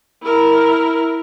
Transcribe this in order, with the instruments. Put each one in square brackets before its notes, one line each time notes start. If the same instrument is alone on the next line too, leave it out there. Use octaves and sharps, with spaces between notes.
[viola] E4 A#4